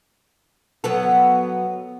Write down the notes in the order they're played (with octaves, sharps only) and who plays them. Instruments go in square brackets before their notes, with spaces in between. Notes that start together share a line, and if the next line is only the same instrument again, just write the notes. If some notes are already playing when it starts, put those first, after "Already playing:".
[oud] F#3 B3 A4